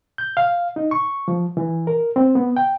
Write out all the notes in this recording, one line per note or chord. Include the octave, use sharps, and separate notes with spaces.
G6
F5
D#4
C#6
F3
E3
A#4
C4
B3
G5